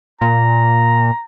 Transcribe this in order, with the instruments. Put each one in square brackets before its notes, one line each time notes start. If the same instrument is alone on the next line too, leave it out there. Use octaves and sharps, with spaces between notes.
[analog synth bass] A#2 [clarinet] A#5